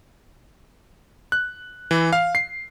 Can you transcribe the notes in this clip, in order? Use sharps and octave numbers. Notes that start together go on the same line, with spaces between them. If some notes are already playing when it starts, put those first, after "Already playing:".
F#6
E3
F5
C7